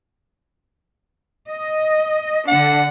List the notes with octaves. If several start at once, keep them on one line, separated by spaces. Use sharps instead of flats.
D#5
D3 D4 F#5